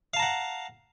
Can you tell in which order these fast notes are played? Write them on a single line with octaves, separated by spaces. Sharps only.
F5 A5 A#5 F#5